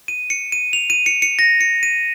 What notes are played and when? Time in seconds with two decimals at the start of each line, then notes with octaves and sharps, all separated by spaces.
0.08 D#7
0.30 C#7
0.52 D#7
0.73 F7
0.90 D#7
1.06 C#7
1.22 C#7
1.39 A#6
1.61 C#7
1.83 D#7